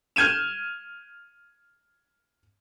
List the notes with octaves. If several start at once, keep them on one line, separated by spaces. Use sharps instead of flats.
F6 G6 G#6 D#7 E7